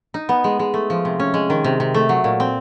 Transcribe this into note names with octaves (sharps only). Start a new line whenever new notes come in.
D#4
B3
G#3
G#3
A3
F3
C3
C#4
G#3
D#3
C3
C3
A3
F#3
A#2
C4